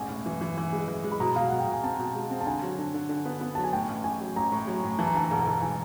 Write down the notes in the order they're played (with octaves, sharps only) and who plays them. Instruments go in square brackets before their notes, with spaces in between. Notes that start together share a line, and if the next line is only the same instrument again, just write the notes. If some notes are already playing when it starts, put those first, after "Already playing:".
Already playing: [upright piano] E1 A1 [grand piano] G#5
[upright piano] A2
E3
E3
E3
G#3
E3
G#3
[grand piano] B5
[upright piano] B2 [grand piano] A#5
[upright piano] B2 [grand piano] F5
[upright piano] B2 [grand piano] F#5
[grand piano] G5
[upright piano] B2
[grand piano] G#5
[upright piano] C4 [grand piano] A5
[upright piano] B2
G#3
C4
[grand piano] A5
[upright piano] D3 [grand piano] G#5
[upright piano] F#3
D3
D3
D3
B3
B3
[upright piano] F#3 [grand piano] A5
[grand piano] G#5
[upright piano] A2 [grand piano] G5
[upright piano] A1
[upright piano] A1 [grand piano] G#5
[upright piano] F#3
[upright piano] A1 [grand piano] A#5
[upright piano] A2
F#3
A2
[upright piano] E3 [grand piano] A5
[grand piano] A#5
[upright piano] D2 [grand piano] A5
[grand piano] A#5
[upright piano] E1 [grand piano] A5
[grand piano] A#5
[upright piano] E1 [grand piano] A5
[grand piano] A5
[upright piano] E3 [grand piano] G#5